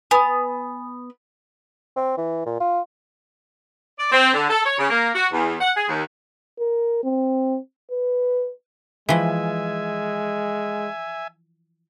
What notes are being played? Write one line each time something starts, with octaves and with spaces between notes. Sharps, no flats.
B3 G#5 D#6
C4
E3
A#2
F4
D5
C4
D3
A4
C#5
C#3
A#3
F#4
E2
F#5
G#4
D#2
A#4
C4
B4
E3 F3 G#3 E5 G#5